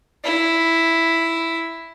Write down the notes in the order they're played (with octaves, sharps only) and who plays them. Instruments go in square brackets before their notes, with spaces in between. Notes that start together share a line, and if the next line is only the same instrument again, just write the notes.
[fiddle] E4